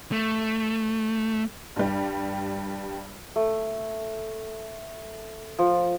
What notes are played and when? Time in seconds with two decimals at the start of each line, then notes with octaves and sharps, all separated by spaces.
0.12 A3
1.76 G2 G3
3.36 A3
5.59 F3